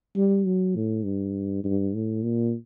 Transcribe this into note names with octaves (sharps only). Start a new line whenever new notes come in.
G3
F#3
A2
G2
G2
A2
A#2